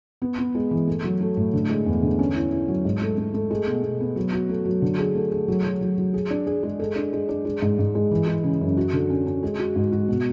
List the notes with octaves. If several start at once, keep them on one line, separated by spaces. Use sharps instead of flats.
B3
B3
G#3
E3
A3
F#3
A3
A2
D3
G#3
E2
D3
C#4
E4
E4
F#3
G#2
A3
A3
A3
G#3
B2
B2
B3
F#3
F#4
A3
F#3
D3
G#4
A3
G#4
F#3
F#3
F#3
F#3
G#4
D4
G#4
G#3
A4
D4
G#3
D4
G#3
G#2
G#2
G#3
E3
G#3
C#3
F#2
F#4
D3
C#4
C#4
G#3
F#4
G#2
F#4
B2